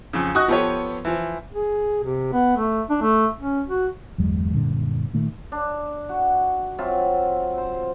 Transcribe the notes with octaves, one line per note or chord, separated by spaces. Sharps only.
F2 C#3
F#4 D#5 C#6 D#6 F#6
F3 B3 G4 A4 B4 C#5
E3 F3
G#4
C3
B3
A3
D4
A3
C#4
F#4
G1 E2 F#3 G#3
F#2 A#2 D3 G3
A#2 D#3 A3
D4
F#4
F#3 C4 F4 E5
C5